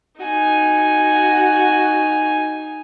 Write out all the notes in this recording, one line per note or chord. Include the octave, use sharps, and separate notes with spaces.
D#4 F#4 G#5